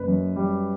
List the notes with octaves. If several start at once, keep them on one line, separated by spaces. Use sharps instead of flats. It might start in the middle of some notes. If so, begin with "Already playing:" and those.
Already playing: F#1 B4
F#2
G3